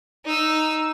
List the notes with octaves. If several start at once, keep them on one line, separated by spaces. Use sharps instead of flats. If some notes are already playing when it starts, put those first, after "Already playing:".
D#4 E6